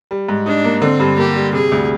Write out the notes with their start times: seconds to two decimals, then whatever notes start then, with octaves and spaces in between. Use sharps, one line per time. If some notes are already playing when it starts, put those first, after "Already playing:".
0.11 G3
0.29 G#2
0.46 D4 D#4
0.64 A#3
0.82 D3 C4
1.00 G2
1.17 A#3 G4
1.35 G3
1.53 C3 G#4
1.72 D2